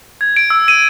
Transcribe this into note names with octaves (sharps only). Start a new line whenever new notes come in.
G#6
D7
E6
D#7